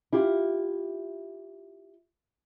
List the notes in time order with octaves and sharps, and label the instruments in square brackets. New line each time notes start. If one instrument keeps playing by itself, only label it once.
[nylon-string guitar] E4 F4 G4